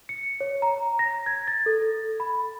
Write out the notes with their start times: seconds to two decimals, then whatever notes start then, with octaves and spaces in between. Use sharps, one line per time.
0.09 C#7
0.41 C#5
0.62 A#5
0.99 A#6
1.26 G#6
1.47 A6
1.66 A4
2.20 B5